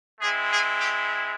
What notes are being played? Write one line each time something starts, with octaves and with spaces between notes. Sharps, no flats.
G#3 C4 E4 G#4
G#4
G4